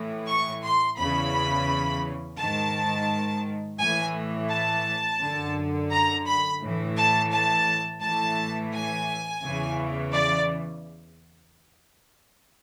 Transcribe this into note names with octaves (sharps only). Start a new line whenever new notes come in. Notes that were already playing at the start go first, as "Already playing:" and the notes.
Already playing: A2 E3
C#6
C6
E2 C#3 E3 B5
G#2 D#3 A5
A2 E3 G#5
A5
F#2 D3
A#5
B5
A2 E3
A5
A5
A2 E3 A5
G#5
E2 C#3 E3
D5